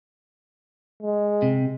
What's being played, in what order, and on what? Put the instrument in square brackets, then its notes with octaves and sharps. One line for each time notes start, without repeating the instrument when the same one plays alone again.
[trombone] G#3
[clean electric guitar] C3